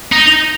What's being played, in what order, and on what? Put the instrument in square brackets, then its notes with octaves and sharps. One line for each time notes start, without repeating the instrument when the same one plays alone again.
[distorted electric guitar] D#4